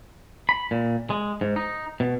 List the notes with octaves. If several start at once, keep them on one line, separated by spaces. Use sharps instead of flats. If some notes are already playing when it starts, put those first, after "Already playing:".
B5
A#2
G#3
G#2
D#4
B2